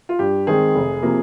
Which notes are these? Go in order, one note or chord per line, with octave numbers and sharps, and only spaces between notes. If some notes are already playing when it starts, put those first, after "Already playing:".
F4
G2 G4
D#3 G#3 C4 G#4
F1
C3 F3 A#3